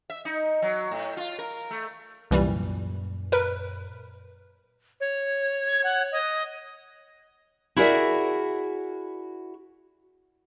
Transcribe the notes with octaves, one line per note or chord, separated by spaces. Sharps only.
E5
D#4
F#3
A2
F4
A#4
A3
C2 F#2 A#2 E3 G3
A#4 B4
C#5
G#6
F#5
D#5
E4 F#4 G#4 A#4 D5 E5